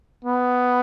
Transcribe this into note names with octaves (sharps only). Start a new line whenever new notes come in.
B3